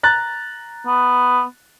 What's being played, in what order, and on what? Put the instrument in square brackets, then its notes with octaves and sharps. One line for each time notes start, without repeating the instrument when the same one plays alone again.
[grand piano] A#5 F#6 A6
[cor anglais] B3